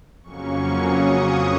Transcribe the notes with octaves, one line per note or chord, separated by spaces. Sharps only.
F2 C#3 F#3 A#3 C#4 C#6
D#6